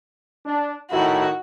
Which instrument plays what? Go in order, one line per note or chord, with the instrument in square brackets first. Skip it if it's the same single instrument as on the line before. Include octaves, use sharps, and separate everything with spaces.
[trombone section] D4
[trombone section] A2 D#3 E4 [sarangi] F#4